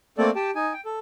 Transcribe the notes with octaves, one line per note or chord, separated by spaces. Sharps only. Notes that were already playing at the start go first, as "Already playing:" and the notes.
A3 A#3 C4 A4 D5
G4 G5 A5
D#4 G#5
G5
A4